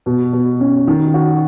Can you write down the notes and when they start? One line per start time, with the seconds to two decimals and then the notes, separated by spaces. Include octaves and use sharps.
0.06 B2
0.33 B2
0.60 C#4
0.87 D#3
1.14 F#4